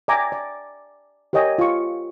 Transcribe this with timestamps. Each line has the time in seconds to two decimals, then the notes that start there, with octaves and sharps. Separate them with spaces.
0.08 D5 E5 G5 G#5 A#5 D6
0.32 D5
1.33 G4 A#4 C#5 D#5 G5 G#5
1.59 F4 C#6